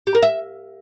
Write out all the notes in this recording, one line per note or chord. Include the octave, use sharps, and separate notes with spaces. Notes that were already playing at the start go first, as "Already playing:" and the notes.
G4
A#4
E5